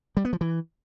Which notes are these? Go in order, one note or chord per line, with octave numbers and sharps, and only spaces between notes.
G3
B3
F3
E3